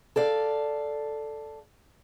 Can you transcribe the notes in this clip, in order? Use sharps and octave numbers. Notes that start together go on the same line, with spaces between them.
A4 D5 F5